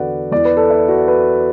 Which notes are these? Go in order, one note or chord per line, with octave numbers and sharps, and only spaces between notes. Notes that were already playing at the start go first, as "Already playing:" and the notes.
Already playing: E2 D3 F#4 A4 B4 D5 F#5
E2 E3 D5
B4
A4
E4
F#4
B4